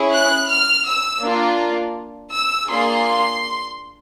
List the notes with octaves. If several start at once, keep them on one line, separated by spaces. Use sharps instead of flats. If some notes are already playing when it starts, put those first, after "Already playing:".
Already playing: C#4 E4 G#4
F#6
F6
E6
A#3 D4 F4
E6
A#3 D4 F4 G#4 C6